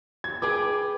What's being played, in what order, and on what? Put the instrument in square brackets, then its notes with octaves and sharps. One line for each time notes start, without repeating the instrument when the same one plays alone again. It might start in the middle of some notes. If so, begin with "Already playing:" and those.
[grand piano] G#6
[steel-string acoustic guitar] G#4 B4 G5 [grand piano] D6